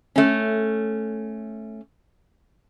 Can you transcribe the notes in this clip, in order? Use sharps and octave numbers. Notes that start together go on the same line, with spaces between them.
A3 C#4